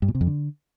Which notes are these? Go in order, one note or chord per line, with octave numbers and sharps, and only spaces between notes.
G2
A#2
C3
F2
D3